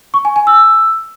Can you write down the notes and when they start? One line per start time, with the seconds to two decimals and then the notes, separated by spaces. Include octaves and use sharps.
0.14 C#6
0.25 G#5
0.36 G#5
0.47 E6